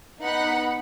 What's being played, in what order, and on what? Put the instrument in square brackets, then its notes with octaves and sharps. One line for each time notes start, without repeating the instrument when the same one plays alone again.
[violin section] B3 D#4 F#5 B5